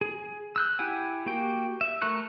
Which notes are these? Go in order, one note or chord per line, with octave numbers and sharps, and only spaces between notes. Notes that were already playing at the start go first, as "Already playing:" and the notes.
G#4
E6 F#6 G6
E4 G4 F#5 G#5
A#3 F#4 G4 G5
E5
A3 A4 A#4 C#6 F#6